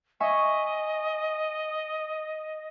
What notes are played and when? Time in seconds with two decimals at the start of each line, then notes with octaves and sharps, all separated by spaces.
0.20 D#5 E5 G#5 C#6